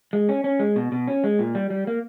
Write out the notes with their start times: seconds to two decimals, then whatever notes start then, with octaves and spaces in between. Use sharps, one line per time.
0.13 G#3
0.29 C#4
0.44 C#4
0.59 G#3
0.76 B2
0.92 B2
1.08 C#4
1.24 G#3
1.39 A#2
1.55 G3
1.70 G3
1.87 A#3